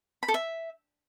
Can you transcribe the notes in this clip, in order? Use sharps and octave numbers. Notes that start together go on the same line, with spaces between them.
B5
A4
E5